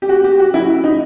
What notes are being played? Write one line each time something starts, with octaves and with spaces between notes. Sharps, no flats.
G4
F#4
G4
F#4
E4
D#4